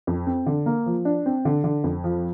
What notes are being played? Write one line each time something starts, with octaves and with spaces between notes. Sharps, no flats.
F2
C4
D3
A#3
F3
D4
C4
D3
D3
F2
F3